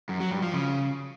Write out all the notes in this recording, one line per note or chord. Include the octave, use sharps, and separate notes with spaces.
F#2
F#3
G2
F3
C#3